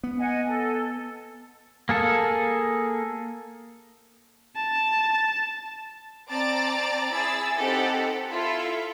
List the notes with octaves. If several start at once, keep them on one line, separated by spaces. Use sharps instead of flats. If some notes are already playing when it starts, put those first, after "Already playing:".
B3
D#5 F#5 G#5
A4
A#3 G#4 A4
A5
C4 D5 A5 A#5 A6 D7
E4 G#4 E6 A6
C4 D#4 G4 A4 F#5
E4 F4 A4 E5